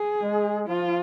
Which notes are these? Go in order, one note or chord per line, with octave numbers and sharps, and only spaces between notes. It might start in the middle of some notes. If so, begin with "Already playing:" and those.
Already playing: G#4
G#3
F3 F4